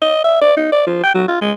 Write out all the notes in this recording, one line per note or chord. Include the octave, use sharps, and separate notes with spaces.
D#5
E5
D5
D#4
D5
F3
G5
F#3
F4
G#3